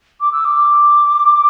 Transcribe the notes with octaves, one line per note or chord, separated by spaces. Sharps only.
D6
E6
D6